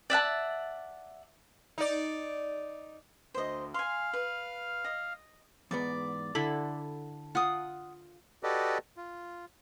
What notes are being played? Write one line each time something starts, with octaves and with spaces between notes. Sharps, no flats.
D5 E5 F#5 A5
D#4 D5
D2 C5 D#5
F5 G#5 C6 F6
B4
D#5
E2 G#2 B3 D5
D3 E4 A4 B5
F4 F#5 D#6
F#4 G4 A4 B4 D5 D#5
F4